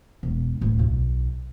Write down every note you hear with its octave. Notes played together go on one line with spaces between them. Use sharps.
E1
D1
B1